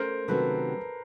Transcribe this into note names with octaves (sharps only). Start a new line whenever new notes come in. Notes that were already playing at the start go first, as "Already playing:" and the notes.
Already playing: A3 C#4 A#4 C5
C3 D#3 F#3 A3 C#4 A4 B4